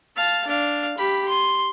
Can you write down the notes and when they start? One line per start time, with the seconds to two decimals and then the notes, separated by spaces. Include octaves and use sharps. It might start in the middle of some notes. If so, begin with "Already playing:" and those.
0.17 F5 A5
0.47 D4 F5
0.98 G4 B5
1.29 C6